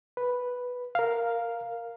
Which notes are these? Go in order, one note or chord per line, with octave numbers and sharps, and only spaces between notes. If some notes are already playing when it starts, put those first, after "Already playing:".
B4
A#4 F5